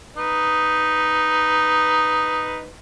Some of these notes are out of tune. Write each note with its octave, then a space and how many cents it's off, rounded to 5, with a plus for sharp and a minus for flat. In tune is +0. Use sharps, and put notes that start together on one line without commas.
D#4 +0 B4 +0